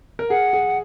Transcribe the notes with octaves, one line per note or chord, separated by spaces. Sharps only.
A#4
G#4 F#5
G#4